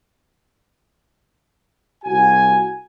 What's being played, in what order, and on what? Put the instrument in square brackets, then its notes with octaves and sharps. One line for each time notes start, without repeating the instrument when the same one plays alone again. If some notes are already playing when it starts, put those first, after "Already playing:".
[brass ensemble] C2 F#4 G#5